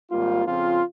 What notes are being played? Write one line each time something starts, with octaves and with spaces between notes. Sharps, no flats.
G#1 G#2 G3 A#3 F4
F2 C#3 F3 C4 F4